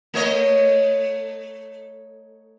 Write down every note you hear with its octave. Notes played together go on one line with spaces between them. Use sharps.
A3 C#5 D#5